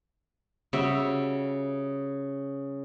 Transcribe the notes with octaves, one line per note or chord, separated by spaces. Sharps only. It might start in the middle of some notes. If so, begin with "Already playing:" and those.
C#3 G3 F#4 E5